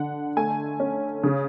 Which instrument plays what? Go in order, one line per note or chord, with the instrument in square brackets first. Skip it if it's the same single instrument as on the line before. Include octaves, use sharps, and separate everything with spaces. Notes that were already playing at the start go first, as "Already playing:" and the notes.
Already playing: [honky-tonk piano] D3 F#5
A3 G#5
C#4
C#3